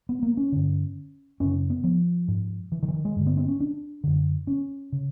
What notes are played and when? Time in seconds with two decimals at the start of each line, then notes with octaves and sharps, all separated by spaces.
0.09 B3
0.23 A#3
0.37 C#4
0.52 G2 D3
1.40 F#2 C#3 C#4
1.70 B3
1.84 F3
2.28 G#2
2.72 E3
2.83 D#3
2.88 E3
2.94 D#3
3.05 G#3
3.16 G2 D3
3.27 B3
3.37 C4
3.48 C#4
3.60 D4
4.04 F#2 D3
4.47 C#4
4.92 C#3